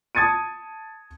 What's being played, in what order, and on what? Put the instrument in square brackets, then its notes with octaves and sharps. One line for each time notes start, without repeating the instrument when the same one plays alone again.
[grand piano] A5 D#6 G#6 A6 C#7 D#7